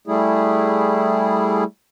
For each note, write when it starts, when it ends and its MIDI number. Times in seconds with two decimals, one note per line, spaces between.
0.07 1.64 55
0.07 1.64 57
0.07 1.64 64
0.07 1.64 68